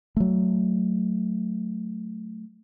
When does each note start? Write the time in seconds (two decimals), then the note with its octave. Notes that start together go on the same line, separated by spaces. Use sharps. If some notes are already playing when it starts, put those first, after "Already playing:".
0.17 F#3 A3